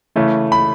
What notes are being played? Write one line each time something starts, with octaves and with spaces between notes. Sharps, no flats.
C#3 E3 A3
B5